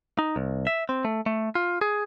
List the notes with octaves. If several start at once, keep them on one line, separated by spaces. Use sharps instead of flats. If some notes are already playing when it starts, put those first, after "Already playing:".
D#4
C2
E5
C4
A3
A3
F4
G#4